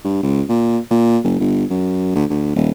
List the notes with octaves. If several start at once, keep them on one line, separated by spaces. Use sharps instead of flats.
G2
C#2
A#2
A#2
F#1
G1
F#2
D2
D2
D#1